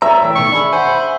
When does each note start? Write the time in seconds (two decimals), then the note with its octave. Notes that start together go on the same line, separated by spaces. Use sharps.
0.02 C#5 D5 E5 A#5
0.22 A2 E3 G5
0.36 B2 D#3 A3 C#6
0.52 D4 G#4 B5
0.73 C5 F#5 G#5